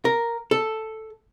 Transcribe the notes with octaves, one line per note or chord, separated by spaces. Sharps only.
A#4
A4